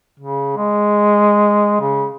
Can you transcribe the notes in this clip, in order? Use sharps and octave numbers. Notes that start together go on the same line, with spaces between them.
C#3
G#3
C#3